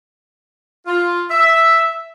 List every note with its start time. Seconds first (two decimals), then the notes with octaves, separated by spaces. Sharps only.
0.86 F4
1.30 E5